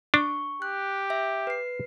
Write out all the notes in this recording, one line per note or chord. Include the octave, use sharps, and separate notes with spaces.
D4 C#6
G4 F#6
E5
B4 C7